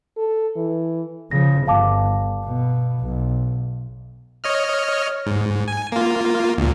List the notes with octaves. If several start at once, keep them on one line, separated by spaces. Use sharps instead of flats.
A4
E3
C#3 F3 A#6
G1 F5 A5 D6
B2
B1
C#5 D#5 F6
G#2
G#5
A#3 F4
D2 A#2